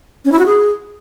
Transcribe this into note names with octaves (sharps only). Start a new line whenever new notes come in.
C#4
E4
F#4
G#4